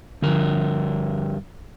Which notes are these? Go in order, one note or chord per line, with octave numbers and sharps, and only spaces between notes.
G2 D3 F3 A#4